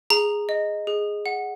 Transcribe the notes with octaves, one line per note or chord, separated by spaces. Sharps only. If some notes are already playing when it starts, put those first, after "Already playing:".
G#4 A#5
D#5
G#4
F#5